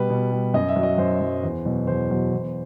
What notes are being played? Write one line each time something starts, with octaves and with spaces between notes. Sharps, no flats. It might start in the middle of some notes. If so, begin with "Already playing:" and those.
Already playing: B2 G3 B4
B2
G3
F#2 D#5
E5
F#3
D#5
F#2 C5
F#3
E2
B2 F#3
E2 C5
B2 F#3
E2